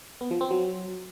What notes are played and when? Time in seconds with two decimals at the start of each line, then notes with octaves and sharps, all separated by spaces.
0.21 B3
0.31 F3
0.41 C4
0.51 F#3